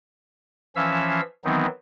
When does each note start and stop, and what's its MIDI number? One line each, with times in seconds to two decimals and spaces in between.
0.76 1.21 52
0.76 1.21 53
0.76 1.21 61
0.76 1.21 76
0.76 1.21 77
0.76 1.21 88
1.44 1.66 51
1.44 1.66 52
1.44 1.66 54
1.44 1.66 59
1.44 1.66 60
1.44 1.66 63